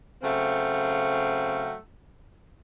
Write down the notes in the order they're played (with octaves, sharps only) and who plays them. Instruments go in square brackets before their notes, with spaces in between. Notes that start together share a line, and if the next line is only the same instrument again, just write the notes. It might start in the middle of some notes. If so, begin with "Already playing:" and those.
[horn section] C#3 F#3 A3 C4 F5 G5